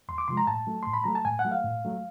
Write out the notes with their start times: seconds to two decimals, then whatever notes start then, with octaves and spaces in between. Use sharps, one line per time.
0.08 E2 C6
0.18 D6
0.28 C3 F3 G#3 C6
0.37 A#5
0.47 A2 A5
0.67 F#3 A3
0.83 A2 C6
0.94 B5
1.04 F#3 A3 A#5
1.15 A5
1.25 A2 G#5
1.39 F#5
1.45 F#3 A3
1.52 F5
1.64 A2
1.85 F#3 A3